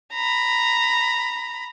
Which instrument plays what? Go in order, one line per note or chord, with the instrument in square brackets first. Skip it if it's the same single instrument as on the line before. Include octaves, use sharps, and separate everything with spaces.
[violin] A#5 B5